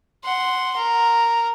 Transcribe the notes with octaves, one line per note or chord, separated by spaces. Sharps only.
F#5 C6
A#4